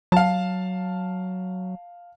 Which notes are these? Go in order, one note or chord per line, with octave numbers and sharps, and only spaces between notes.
F#3 F5 A5